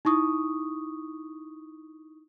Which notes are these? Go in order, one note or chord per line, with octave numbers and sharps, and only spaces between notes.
D#4 E4 C#6 D#6